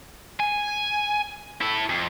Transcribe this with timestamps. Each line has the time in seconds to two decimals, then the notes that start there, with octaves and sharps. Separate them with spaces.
0.40 G#5
1.61 E4 A4
1.89 F2